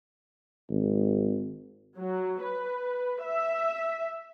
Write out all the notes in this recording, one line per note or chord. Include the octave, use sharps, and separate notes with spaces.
G#1
F#3
B4
E5